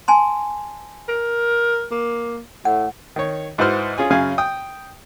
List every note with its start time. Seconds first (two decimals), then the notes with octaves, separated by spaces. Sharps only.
0.08 G#5 A5 C6
1.09 A#4
1.91 A#3
2.65 A2 F#5
3.16 D#3 C#5
3.58 G#2 E4 F#4 B4 C5 F6
3.98 C#4 F4 G#4 G#5
4.10 F#2 C#3 F5 G#5
4.38 G5 D#6